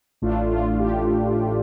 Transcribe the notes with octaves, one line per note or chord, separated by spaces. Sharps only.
A1 A2 A3 D4 F4
F4
G4